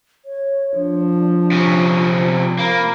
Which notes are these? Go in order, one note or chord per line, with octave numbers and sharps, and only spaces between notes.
C#5
F3 D4
C3 C#4
C4
A#3 B5